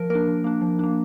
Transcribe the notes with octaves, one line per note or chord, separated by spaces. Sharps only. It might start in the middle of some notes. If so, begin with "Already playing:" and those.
Already playing: F3 A#4
A#3 D4 A#4
F3
A#3 D4
F3
A#3 D4